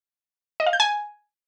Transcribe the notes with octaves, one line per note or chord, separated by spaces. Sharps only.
D#5
F5
G6
G#5